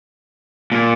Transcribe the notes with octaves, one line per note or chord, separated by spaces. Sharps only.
A#2